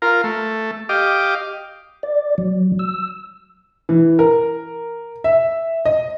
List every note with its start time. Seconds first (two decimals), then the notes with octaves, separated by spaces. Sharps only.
0.02 F4 A#4
0.24 A3
0.89 G4 D#5 F5 D6
2.03 D5
2.38 F#3
2.79 E6
3.89 E3
4.19 A#4
5.24 E5
5.86 D#5